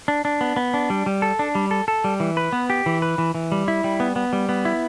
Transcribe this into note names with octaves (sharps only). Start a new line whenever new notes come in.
D4
D4
B3
B3
D4
G3
G3
A4
D4
G3
A4
A4
G3
E3
B4
B3
G4
E3
B4
E3
E3
G3
E4
G3
B3
B3
G3
B3
E4